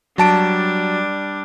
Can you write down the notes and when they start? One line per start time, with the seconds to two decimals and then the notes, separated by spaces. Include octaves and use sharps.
0.18 F#3 G3 D4 A5 D7